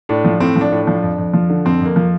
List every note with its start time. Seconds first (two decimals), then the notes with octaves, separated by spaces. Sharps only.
0.09 A2 D4
0.25 F3
0.40 A2 C4
0.56 F3
0.61 D4
0.72 A2
0.82 D4
0.87 F3
1.03 F2
1.18 F2
1.34 F3
1.50 D3
1.65 F2 C4
1.81 F2 A#3
1.96 F3